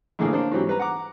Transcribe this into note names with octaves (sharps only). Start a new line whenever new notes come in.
A#1 A2 D3 A#3 G#4
A#3 D4 C5 C#5
G#2 E3 F#3 C4 G4
G3 B4 A#5
F#5 A#5 D6